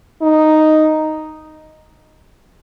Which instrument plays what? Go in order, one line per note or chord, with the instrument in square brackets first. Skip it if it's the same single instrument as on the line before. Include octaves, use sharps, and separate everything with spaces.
[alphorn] D#4